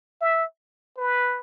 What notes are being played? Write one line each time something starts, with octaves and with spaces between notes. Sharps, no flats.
E5
B4